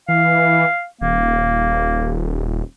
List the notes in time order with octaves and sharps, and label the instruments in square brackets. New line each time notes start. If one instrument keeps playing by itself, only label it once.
[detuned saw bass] E3 [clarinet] F5
[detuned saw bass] D#1 [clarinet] A#3